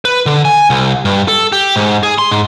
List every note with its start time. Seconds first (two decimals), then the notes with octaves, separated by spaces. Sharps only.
0.05 B4
0.26 D3
0.45 G#5
0.70 C2
1.05 G2
1.28 A4
1.52 G4
1.76 G#2
2.03 G#4
2.19 C6
2.31 G#2